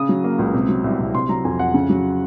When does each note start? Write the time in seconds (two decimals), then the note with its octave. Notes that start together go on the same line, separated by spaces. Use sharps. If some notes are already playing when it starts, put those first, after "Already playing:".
Already playing: C#3 D#6
0.09 F#3
0.24 A#3
0.39 C#2
0.54 C3
0.69 F#3
0.84 C2
0.99 C2
1.14 C3 C6
1.29 F#3 A#5
1.45 F2 G#5
1.59 F2 F#5
1.74 C#3
1.90 F#3